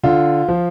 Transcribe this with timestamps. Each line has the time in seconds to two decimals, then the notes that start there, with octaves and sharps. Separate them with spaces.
0.03 D3 F4
0.48 F3